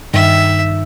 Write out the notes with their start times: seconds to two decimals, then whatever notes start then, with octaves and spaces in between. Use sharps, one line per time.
0.14 G2 D#3 E5